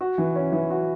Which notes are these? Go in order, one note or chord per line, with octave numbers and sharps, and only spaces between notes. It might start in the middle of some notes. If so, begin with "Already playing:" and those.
F#4
E3
C#4
E3
F#4